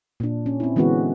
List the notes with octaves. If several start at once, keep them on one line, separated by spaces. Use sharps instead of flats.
A#2 D4
C#4
C4 E4
D3 E3 G#3 B3 C#4 F#4